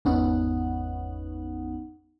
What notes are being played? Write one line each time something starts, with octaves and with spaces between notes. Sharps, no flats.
G#1 E2 B3 C#4 D#4 F#5